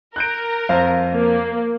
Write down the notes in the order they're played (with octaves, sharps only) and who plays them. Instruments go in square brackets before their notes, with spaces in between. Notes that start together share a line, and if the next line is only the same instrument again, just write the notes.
[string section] A#4 [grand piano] F#6 G6 D7
[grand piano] F2 C5 F5
[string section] A#3